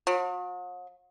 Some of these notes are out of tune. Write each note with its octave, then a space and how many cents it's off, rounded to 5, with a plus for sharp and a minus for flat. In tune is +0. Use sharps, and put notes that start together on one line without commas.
F#3 -45